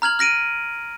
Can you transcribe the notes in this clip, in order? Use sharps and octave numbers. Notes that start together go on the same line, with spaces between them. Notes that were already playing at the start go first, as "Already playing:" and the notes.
A#5 F6 G#6 F#7
F6 A#6 D7 D#7